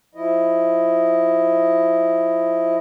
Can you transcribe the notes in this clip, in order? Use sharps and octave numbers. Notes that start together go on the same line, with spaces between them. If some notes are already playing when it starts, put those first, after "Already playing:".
F3 E4 D#5